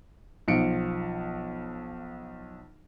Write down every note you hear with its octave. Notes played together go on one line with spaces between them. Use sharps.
B1 F3 C#7 D7